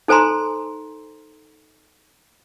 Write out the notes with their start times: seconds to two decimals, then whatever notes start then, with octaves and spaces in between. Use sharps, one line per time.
0.08 D#4 A4 C5 G#5 A#5 C6